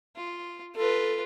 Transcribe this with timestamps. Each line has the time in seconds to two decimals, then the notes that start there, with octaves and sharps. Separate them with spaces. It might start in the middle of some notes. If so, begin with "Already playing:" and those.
0.17 F4
0.76 F4 A4 B4